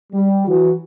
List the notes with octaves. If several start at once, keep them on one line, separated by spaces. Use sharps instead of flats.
G3
E3 F#3 F#4